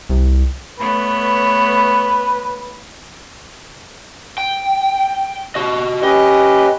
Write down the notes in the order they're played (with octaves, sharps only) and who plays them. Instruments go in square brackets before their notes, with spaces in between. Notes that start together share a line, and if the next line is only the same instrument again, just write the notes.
[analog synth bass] C2
[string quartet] A3 B3 C#5 [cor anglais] B4
[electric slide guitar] G5
F#4 D#5
[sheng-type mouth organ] C#4 G4 B4 [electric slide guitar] D#5